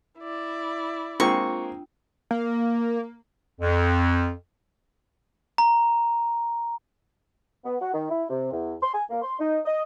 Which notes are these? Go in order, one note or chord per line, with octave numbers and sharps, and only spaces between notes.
E4 D5
G#3 A#3 C4 D4 F4 G5 C#6
A#3
F2
A#5
B3
F#4
D#3
E4
C3
E2
C6
G#5
A#3
C6
D#4
D#5